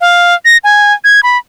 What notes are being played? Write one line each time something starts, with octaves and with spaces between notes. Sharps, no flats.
F5
A#6
G#5
G#6
B5